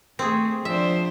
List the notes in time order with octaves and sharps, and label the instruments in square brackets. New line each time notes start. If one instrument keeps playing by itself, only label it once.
[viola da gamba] A3 [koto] C4 G#4
[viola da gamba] F3 D4 C5 [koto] E5